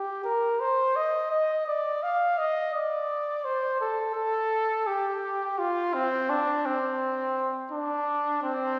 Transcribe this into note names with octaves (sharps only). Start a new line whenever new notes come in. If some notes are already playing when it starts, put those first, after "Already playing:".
Already playing: G4
A#4
C5
D#5
D#5
D5
F5
D#5
D5
C5
A4
A4
G4
F4
C4
D4
C4
D4
C4